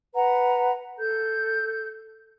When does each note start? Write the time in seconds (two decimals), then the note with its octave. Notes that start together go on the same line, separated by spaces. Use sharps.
0.14 B4 F#5 A#5
0.99 A4 G6